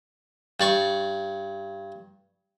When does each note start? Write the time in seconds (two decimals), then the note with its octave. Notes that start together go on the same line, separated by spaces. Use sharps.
0.60 G2 D5 C#6